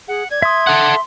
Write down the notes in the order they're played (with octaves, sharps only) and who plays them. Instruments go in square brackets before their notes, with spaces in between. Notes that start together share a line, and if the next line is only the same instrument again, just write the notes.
[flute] G#4 [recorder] F#5
[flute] D5 [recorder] G#6
[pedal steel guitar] E5 D#6 [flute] C6
[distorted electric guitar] A4 F#5